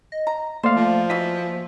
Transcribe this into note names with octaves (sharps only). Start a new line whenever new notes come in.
D#5
A#5
A3 A#3 C5 D5 F5
F3
E3 F#4 D#5 B6